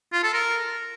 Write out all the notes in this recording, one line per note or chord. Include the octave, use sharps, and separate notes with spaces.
F4
A4
A#4